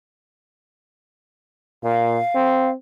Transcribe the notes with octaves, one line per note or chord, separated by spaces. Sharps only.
A#2 F5
C4